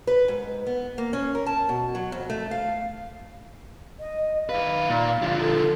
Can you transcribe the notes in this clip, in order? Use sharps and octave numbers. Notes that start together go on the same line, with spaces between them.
B4
G#2
B3
A#3
C#4
A#4
A5
B2
F#3
F2
A3
F5
D#5
D#3 B4 F5
A#2
D3 F3
A4